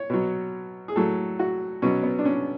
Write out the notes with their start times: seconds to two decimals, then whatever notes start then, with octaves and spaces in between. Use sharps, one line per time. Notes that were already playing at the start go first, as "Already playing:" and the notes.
Already playing: C#5
0.10 B2 F#3
0.88 G#4
0.96 A2 F#3 A4
1.39 F#4
1.82 B2 F#3 C#4
2.03 B3
2.19 D4
2.25 C#4